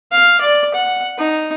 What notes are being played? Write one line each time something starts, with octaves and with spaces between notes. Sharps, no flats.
F5
D5
F#5
D#4